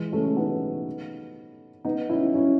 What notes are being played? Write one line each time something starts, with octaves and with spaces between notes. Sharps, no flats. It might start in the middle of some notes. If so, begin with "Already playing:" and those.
Already playing: E3 G#3
A3 C#4
B3 D#4
B3 D#4
C#4 E4
C#4 E4